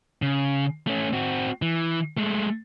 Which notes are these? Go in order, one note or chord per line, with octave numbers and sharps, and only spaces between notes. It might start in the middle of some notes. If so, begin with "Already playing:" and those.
C#3
A3 C#4
C4 F#4
E3
G#3 A3